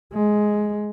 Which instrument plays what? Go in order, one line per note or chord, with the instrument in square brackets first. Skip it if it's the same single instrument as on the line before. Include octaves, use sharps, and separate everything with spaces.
[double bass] G#3